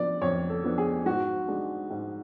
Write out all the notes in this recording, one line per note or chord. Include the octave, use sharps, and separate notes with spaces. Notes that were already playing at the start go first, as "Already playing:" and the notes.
Already playing: F3 B3 D4 D5
F2 C#5
A4
F3 B3 D4
G#4
G#2 F#4
G#3 D4
G#2